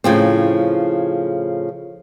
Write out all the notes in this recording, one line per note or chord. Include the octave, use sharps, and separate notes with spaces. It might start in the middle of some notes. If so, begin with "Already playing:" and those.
A2 C#3 F3 C4